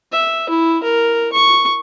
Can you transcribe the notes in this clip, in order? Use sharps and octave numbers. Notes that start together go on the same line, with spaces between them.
E5
E4
A#4
C#6